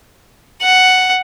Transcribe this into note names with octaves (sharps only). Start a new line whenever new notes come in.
F#5